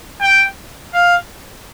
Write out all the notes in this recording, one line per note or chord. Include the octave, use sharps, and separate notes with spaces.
G5
F5